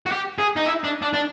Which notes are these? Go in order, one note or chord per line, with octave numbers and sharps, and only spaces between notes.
F#4
G4
G#4
D#4
E4
D4
D4
D4